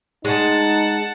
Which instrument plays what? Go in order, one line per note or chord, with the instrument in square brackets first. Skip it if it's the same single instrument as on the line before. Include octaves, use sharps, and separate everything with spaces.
[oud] G#3 [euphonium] D#4 [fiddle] F#5 A5